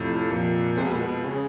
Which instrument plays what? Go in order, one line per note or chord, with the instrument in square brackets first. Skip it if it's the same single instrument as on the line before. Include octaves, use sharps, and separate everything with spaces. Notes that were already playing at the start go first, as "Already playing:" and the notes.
Already playing: [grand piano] F2 C3 [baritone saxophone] A2
[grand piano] F2 [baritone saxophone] A#2
[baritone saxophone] C3 [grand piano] G#3
[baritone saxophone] B2
A#2
B2
C#3